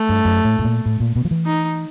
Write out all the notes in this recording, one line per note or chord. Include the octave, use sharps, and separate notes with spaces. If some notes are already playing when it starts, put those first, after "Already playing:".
Already playing: A3
G2
F#2
A2
A2
A#2
A2
A#2
B2
F3
E3
D#4